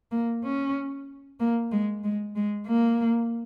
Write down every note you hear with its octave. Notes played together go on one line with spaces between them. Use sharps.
A#3
C#4
A#3
G#3
G#3
G#3
A#3